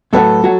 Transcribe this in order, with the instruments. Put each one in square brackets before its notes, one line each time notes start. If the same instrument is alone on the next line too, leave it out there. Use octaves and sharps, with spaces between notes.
[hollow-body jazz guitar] A2 F#3 B3 F#4 [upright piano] A4
[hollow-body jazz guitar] F#3 F#4